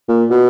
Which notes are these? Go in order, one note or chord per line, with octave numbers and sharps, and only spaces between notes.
A#2
B2